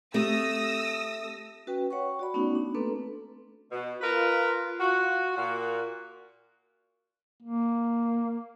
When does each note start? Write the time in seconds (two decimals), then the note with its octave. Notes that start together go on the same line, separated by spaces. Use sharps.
0.14 A3 C4 F4 G4 D#6 E6 A#6
1.67 C#4 F#4 B4 G5
1.90 C#5 F#5 G5 C#6
2.19 F#4 D5 B5
2.34 A3 B3 C#4 D#4 F#4
2.55 D4
2.75 A3 A#3 C4 D4 A4 B4
3.71 B2
4.01 F4 A#4 B4
4.80 F#4
5.36 A#2 A#3 F#4
7.43 A#3